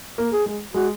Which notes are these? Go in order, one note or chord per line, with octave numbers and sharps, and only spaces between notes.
A#3
G#4
G#3
G#3 F#4